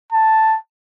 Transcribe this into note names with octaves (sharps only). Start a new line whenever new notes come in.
A5